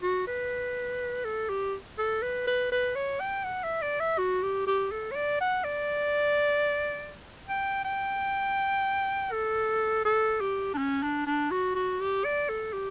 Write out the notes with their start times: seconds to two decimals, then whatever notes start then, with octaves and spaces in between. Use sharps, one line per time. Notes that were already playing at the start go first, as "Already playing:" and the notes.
0.02 F#4
0.27 B4
1.25 A4
1.49 G4
1.98 A4
2.23 B4
2.47 B4
2.72 B4
2.96 C#5
3.20 G5
3.44 F#5
3.64 E5
3.82 D5
4.00 E5
4.18 F#4
4.43 G4
4.67 G4
4.91 A4
5.11 C#5
5.16 D5
5.41 F#5
5.64 D5
7.48 G5
7.85 G5
9.32 A4
10.05 A4
10.41 G4
10.74 D4
10.78 C#4
11.03 D4
11.27 D4
11.51 F#4
11.75 F#4
12.00 G4
12.25 D5
12.49 A4
12.73 G4